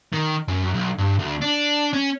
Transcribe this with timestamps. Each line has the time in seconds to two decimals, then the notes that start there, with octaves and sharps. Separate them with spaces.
0.13 D#3
0.48 F#2
0.74 B1
0.98 G2
1.19 D2
1.42 D4
1.93 C#4